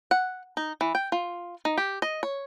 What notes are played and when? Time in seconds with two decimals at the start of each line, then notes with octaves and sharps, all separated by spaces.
0.11 F#5
0.57 D#4
0.81 E3
0.95 G5
1.12 F4
1.65 D#4
1.78 G4
2.02 D#5
2.23 C#5